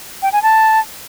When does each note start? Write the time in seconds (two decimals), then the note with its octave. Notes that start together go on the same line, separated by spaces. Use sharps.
0.22 G5
0.33 G#5
0.43 A5